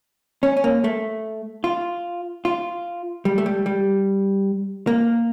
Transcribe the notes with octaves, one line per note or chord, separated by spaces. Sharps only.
C#4
C#4
A#3
A3
F4
F4
G3
A3
G3
G3
A#3